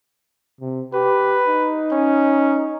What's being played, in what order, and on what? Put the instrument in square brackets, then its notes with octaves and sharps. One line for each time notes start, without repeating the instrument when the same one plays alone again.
[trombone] C3
[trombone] G4 [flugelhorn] B4
[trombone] D#4
[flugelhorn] C#4